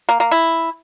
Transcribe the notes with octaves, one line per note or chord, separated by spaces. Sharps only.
A#3
A#3
E4